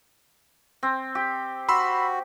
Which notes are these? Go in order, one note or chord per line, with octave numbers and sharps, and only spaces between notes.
C4
G4
F#4 B5 C6 E6